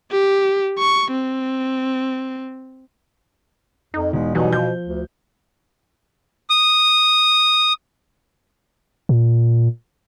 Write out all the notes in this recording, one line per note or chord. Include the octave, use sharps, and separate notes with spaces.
G4
C#6
C4
F2 D#4
E1 G#3
B2 E3 F#3 G3 D#4
F3 G6
D2
D#6
A#2